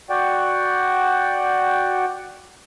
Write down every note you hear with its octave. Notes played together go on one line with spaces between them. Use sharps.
F#4 D5 F#5 G5